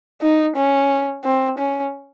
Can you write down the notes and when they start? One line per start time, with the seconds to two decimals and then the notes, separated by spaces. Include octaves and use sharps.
0.22 D#4
0.56 C#4
1.24 C4
1.58 C#4